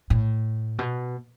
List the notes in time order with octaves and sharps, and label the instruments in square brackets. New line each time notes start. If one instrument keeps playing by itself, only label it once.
[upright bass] A2
B2